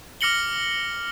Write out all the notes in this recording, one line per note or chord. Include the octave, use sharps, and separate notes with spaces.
D6 F6 A#6 C#7 F#7 G7